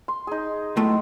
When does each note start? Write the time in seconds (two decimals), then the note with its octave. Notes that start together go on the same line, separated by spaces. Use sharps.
0.08 C6
0.27 D#4 G#4
0.76 B1 A2 G#3 A3